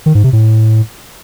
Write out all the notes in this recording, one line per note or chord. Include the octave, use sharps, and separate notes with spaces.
D#3
G#2
C3
A2